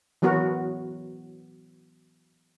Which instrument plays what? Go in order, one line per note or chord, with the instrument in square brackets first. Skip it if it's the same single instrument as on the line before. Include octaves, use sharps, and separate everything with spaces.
[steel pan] E3 F#3 B3 F#4 A#4